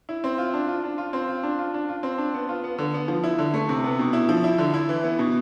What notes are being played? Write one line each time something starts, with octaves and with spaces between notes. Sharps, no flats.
E4
C4
F4
D4
F4
D4
F4
C4
F4
D4
F4
D4
F4
C4
D4
B3
F4
B3
D3
B3
F3
E4
D3
A3
C3
B3
B2
E4
F3
E4
D3
E4
E3
B3
B2